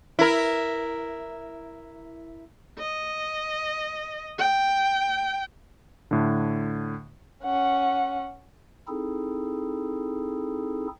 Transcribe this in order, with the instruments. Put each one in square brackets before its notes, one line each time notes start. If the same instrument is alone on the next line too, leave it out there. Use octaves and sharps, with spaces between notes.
[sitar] E4 A#4
[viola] D#5
G5
[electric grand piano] A2 D3
[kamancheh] C#4 F#5
[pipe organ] C4 D#4 E4 G#4 A4